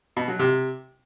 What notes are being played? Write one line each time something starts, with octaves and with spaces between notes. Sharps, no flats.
B2
F#3
C3